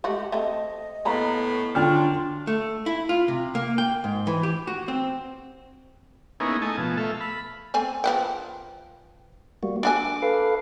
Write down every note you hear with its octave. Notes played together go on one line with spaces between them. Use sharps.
G#3 A3 F#4 G4
A3 C4 A4 D#5
A2 A#3 B3 A#5 B5
D3 F#3 D4 F4 G5 F6
A3
E4
F4
C3
A#3
G5
G#2
E3
G4
F#4
C4
A#3 B3 C#4 D#4 E4 G#4
A3 D#5 G#5 A5
B2 F3
A3 A4 E5 F5
B5
A3 C4 G#5
F3 B4 G5
G3 A#3 F#4
D4 F#4 G#5 D6
A4 B4 F5